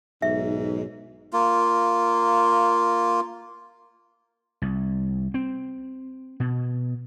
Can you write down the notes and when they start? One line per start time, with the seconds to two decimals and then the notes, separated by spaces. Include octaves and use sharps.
0.22 B1 G#2 E5
1.33 A#3 F4
4.62 C2
5.34 C4
6.40 B2